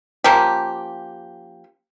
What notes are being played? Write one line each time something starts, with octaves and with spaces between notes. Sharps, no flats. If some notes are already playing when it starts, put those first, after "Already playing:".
F3 A#3 C#4 G4